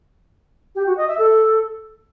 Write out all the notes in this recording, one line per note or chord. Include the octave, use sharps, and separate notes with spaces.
G4
F#4
D#5
E5
A4